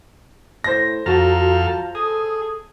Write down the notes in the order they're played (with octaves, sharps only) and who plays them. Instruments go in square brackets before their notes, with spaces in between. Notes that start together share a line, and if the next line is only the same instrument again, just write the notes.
[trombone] A2 [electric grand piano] C5 A#6
[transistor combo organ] F2 A4 F6 [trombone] F4 [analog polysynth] F#4 A5 A#5
[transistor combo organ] G#4 [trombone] A4 [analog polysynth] D#6